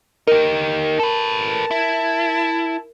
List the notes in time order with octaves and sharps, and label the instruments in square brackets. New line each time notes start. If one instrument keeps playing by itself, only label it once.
[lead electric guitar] D#4 G4 [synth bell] A#4
[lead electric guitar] A4 B4 [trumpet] A5
[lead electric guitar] E4